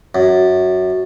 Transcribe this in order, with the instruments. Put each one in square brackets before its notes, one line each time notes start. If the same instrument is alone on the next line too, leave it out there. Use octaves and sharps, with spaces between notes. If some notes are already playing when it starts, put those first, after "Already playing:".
[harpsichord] F#2